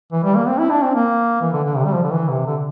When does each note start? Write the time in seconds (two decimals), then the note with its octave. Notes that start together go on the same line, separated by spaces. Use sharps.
0.12 E3
0.24 G3
0.35 A#3
0.48 C4
0.59 E4
0.70 D4
0.82 C4
0.94 A#3
1.41 E3
1.53 D3
1.64 D3
1.76 C3
1.85 G3
1.94 F3
2.03 D3
2.12 E3
2.28 C3
2.46 D3